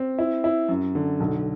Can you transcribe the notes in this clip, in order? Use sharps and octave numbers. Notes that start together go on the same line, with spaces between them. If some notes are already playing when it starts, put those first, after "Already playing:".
Already playing: C4
E4
E4
F#2
D3
B1